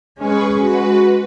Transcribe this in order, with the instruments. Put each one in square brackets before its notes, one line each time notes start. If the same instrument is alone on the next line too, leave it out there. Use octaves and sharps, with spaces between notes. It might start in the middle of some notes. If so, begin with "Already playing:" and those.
[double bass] G#3 C#4 [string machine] G#4 B4 C#6
[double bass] G#3 [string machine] F#4 B4